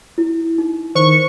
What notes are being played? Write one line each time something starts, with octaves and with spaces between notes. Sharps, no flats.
E4
D#4
D#3 C5 C#6